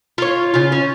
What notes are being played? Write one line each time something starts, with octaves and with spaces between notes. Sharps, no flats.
F4 C#5
C#3 F4
C#4